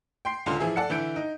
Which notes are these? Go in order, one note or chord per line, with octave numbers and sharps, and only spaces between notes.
G5 C6 C7
C#2 D3 C#4 F4 C6
E3 F3 G#4 E5
A4 D5 F#5 A5 C#7
D3 E3 E5 G6 D7
D#4